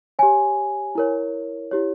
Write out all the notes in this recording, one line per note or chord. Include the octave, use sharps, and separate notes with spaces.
G4 C#5 G#5
E4 A#4 C#5
E4 G4 C#5